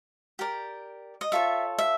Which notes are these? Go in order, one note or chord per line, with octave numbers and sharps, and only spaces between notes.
G4 A#4 D5
D#5
F4 A4 C#5 E5
E5